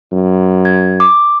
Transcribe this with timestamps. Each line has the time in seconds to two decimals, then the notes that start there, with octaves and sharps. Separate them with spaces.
0.12 F#2
0.65 G#6
1.00 D6